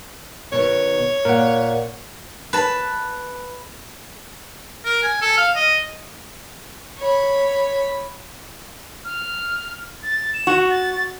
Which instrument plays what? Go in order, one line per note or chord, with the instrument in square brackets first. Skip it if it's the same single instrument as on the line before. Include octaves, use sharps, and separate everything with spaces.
[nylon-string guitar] B2 D#3 [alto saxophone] C#5
[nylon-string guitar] A#2 [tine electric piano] A#4 F#5
[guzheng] B4 A5
[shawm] A#4
G#5
A4
F5
D#5
[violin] C#5 B5
[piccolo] F6
A6
E7
[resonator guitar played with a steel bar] F#4
[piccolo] A6